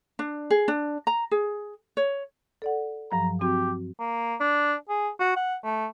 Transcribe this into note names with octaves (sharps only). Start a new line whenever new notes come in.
D4
G#4
D4
A#5
G#4
C#5
A4 D5 F#5
G2 F3 F#3 A#5
C4 F#4 G4
A#3
D4
G#4
F#4
F#5
A3